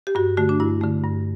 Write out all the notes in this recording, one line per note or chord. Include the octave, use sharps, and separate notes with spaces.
G4
G2 F#4
D3 A3 F#4
D4
G2 E4
D3 A3
G2